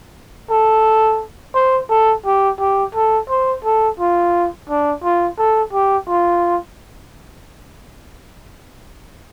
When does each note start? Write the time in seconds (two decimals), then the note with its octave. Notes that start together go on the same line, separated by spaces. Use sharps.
0.51 A4
1.55 C5
1.90 A4
2.26 G4
2.60 G4
2.94 A4
3.30 C5
3.65 A4
3.99 F4
4.69 D4
5.04 F4
5.38 A4
5.73 G4
6.08 F4